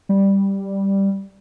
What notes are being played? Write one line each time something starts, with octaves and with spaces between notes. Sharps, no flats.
G3